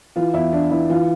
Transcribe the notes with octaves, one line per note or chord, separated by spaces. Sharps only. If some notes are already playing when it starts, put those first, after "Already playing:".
E3 F4
E2 E4
E3 D4
E3 E4
E3 F4